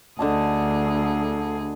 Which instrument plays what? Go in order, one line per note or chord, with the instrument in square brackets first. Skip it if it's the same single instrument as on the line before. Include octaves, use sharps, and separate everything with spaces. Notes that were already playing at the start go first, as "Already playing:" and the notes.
[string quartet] D2 G#4 [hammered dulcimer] D3 D#5 A5